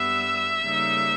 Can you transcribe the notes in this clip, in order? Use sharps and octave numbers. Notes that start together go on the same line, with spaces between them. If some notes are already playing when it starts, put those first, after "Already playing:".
Already playing: G2 G3 B3 E5 E6
C#3 G3 A#3 D#4